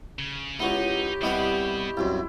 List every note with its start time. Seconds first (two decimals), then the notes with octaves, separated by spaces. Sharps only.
0.19 C#3
0.60 C#2 B3 D#4 E4 G4 C#5
1.22 C2 B2 G3 B3 E4 D#5 B5
1.97 C2 F#2 E4 C5